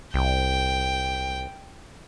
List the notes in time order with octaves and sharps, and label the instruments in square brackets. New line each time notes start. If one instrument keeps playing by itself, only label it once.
[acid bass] C2 [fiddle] G5